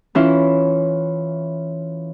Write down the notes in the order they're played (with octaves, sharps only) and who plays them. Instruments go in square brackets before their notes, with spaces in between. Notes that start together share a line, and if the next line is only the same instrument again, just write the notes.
[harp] E3 C#4 E4 F4